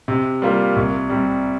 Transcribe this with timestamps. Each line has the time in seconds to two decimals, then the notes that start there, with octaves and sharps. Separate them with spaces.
0.08 C3
0.42 G3 A#3 F4
0.76 C2
1.09 C3 G3